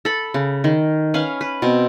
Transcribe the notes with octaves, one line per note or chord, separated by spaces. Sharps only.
A4 B5
C#3
D#3
C#4 B4 F5
B4
B2 C4